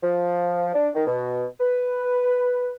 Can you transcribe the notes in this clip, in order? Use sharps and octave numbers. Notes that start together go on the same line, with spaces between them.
F3
D4
D#3
B2
B4